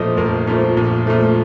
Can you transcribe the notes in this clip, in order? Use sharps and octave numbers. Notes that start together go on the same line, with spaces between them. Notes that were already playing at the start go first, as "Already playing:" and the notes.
Already playing: A#1 A#2 F3 A3 C5 D#5
A#1 A#4
A#2 F3 A3
A#1
A#2 F3 A3